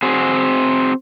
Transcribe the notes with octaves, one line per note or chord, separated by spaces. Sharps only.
C4 F#4 G#4